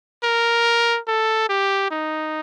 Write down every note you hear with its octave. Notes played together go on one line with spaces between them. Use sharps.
A#4
A4
G4
D#4